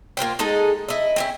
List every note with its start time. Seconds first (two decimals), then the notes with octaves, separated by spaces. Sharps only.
0.17 A#3 F4 C5 G5
0.39 G#3 D#4 G#4 A4
0.88 E4 D#5
1.16 C4 C#4 E4